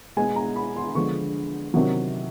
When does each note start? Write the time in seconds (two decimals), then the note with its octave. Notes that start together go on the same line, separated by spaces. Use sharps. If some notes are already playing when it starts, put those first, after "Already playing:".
0.17 B2 G#3 B3 G#5
0.36 A#5
0.56 B5
0.76 C6
0.95 D3 F3 G#3 B3 C#6
1.74 C3 D#3 F#3